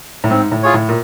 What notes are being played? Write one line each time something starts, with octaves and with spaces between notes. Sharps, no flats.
A2
G#2 C4
A2
F4 G#4 C#5
A2
A#2